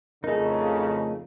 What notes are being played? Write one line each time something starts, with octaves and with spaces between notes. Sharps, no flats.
F2 A2 C#3 A3 D#4 G#4 A#4